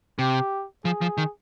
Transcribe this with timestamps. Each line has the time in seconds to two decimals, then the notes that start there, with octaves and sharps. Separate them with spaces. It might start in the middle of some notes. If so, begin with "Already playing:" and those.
0.19 C3 G4
0.85 F3 G#4
1.01 F3
1.18 D#3